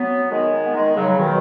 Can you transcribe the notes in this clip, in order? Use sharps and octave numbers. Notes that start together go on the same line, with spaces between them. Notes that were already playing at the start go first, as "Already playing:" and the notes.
Already playing: F#3 B3
D#3 G#3
B3
D#3 G#3
C#3 F#3
F#3
B2 D#3